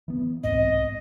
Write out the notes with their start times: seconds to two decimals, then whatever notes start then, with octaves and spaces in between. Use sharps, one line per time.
0.08 E3 B3
0.43 C2 G#2 C4 D#5